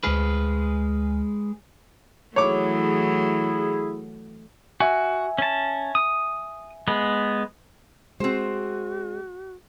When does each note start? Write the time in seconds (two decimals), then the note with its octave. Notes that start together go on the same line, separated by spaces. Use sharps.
0.04 D2 G#3 G#4 B4 F6
2.36 E3 F#3 A3 E4 G#4 C#5 D6
4.80 F#4 E5 G#5
5.38 C#4 A5
5.95 D#6
6.88 G#3 B3
8.20 G#3 C4 F#4 C5